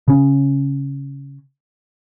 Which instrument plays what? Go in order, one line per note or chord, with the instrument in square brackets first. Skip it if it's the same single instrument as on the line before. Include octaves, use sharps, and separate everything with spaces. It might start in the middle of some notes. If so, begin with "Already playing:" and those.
[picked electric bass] C#3 C#4